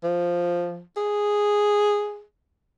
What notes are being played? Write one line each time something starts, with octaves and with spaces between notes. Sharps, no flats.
F3
G#4